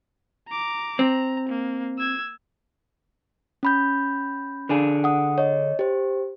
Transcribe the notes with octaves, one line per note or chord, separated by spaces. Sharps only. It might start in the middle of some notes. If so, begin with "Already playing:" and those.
A#5 D6
C4 A#5
A#3
E6 G#6
C#4 B5 G6
D3 D4 G#4
F#5 D#6
C#5 D#5
G4 C5